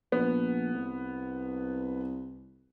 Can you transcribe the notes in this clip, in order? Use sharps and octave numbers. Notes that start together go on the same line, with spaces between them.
A#1 B3
C2